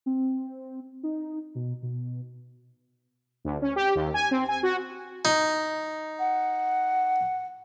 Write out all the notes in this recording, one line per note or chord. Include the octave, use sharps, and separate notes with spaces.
C4
D#4
B2
B2
D2
C#4
G4
D#2
G#5
C4
G#5
F#4
D#4
F#5